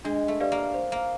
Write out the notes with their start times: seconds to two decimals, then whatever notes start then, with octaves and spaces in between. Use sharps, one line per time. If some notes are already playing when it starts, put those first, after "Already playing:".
0.05 G#3 D4
0.28 A3
0.40 G4 B4 D5 F5
0.52 A#3
0.74 C5
0.92 A#3